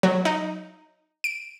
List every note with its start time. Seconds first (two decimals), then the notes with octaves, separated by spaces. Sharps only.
0.03 F#3
0.25 D#4
1.24 D7